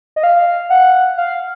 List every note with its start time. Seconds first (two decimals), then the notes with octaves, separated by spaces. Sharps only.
0.16 D#5
0.23 F5
0.70 F#5
1.18 F5